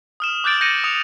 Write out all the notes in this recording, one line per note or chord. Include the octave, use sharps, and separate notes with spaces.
D#6 F6 E7
D6 F#6 G6 A6 D7 F#7
G6 A#6 C#7 D#7 F#7
D#6 C#7 F7